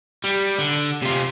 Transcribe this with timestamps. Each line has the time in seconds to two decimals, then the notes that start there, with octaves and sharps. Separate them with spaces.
0.24 G3
0.59 D3
1.02 C3 F4